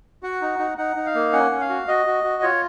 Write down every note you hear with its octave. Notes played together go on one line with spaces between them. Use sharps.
F#4 F#5
D#4
D#4
D#4 F#5
D#4
F5
A#3
C#4 F#5
C#4
F5
F#4
F#4 D#5
F#4
F#4
F4 C#5